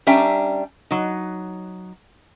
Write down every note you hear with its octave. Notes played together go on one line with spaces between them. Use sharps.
G3 C#4 D4 E5 G5 A#5
F#3 D#4